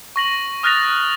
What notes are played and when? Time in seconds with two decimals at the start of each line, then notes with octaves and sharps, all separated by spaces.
0.16 C#6 A#6 F#7
0.63 D#6 F6 F#6 A6 A#6 F7